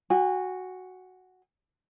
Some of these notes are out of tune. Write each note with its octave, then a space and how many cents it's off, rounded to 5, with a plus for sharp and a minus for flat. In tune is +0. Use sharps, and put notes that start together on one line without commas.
F#4 +0 G#5 -35